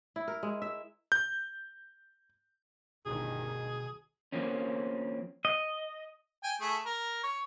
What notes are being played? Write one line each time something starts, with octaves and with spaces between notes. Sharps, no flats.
E4
A#4
G#3
E5
G6
G1 D2 B2 D#3 G#4
F3 A#3 C4 C#4
D#5
G5 G#5
A3 G#4
A#4
C#5